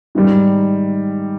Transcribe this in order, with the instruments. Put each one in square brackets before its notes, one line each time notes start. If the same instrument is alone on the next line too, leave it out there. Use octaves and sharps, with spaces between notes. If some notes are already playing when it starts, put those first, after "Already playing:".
[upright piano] G#2 D#3 G3